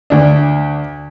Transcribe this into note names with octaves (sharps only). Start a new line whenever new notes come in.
D2 D4